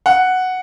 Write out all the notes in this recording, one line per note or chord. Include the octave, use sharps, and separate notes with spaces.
F#5